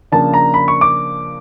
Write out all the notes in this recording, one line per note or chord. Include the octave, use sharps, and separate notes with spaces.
C#3 F3 A#3 D4 A5
A#5
B5
C#6
D6